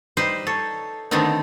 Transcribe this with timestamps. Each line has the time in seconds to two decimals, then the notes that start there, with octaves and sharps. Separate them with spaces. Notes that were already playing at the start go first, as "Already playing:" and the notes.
0.17 G3 D#4 B4 C5
0.47 A4 C#5
1.11 D3 D#3 A3 B3 C4 D#4